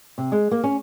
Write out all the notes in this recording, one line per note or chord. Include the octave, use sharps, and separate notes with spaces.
C3
G#3
A#3
C#4